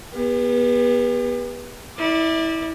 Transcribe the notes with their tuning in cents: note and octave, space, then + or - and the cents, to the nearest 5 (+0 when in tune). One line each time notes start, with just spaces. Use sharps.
B3 -25 G4 +45
E4 -25 D5 +15